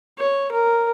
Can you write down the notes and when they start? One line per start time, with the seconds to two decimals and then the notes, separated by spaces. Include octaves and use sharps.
0.19 C#5
0.52 A#4